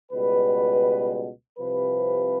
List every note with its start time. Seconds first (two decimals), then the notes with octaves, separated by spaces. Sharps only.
0.12 C#2 B2 G3 B4
1.59 C2 C3 F3 B4